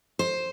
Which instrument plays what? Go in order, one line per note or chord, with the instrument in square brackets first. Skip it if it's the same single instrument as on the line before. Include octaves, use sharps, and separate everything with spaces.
[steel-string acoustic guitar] C5